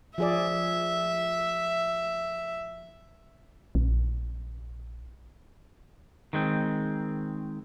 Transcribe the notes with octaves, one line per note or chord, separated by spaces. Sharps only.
F3 G#4 D5 E5
A#1
D#3 G#3 C4